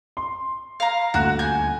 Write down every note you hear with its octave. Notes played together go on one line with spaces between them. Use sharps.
C6
F5 A#5
D#1 D2 F#4 F#6
G#5 G6